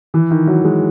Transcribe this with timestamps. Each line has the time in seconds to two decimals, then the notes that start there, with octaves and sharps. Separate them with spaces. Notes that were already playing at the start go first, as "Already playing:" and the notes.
0.14 E3
0.31 D#3
0.47 F#3
0.64 G#3